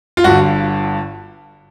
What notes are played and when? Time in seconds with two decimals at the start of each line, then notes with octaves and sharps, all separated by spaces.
0.17 F4
0.24 G1 G2 D3 F#4